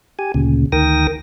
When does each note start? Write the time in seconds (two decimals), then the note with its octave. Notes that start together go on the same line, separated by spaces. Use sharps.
0.19 G4 G#5
0.34 D2 A#2 C#3
0.72 D2 D#3 A#4 G5 D#6 A#6